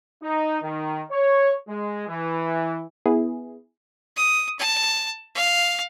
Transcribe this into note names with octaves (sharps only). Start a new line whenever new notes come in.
D#4
D#3
C#5
G#3
E3
B3 E4 G#4
D#6
A5
F5